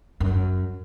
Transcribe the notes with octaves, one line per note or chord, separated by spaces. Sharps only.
F#2